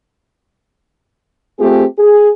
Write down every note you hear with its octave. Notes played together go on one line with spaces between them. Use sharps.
A3 C4 F4 G4 G#4
G#4